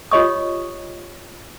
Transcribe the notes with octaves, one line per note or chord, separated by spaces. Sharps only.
F4 G4 C#5 D#5 C#6 D#6